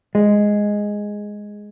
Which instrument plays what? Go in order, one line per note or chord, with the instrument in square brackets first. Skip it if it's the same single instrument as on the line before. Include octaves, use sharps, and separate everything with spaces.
[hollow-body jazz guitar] G#3